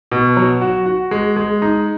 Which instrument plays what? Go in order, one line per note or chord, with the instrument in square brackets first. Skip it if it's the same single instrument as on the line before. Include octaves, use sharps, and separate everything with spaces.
[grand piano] B2
F#3
F#4
F#4
G#3
G#3
D#4